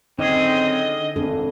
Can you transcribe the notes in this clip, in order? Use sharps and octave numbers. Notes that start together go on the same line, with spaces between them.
D3 F#3 C4 C#4 D#4 G#4 D#5
G#1 C4 D4 A4